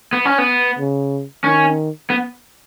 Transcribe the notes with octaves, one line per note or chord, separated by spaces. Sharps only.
B3
C#4
B3
C#3
D#3 C#4
B3